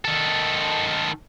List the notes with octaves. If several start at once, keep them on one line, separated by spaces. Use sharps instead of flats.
D#3 A4